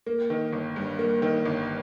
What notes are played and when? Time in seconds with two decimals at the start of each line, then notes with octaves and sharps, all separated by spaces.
0.06 A#3
0.30 D#3
0.53 G1
0.76 G2
0.99 A#3
1.22 D#3
1.45 G1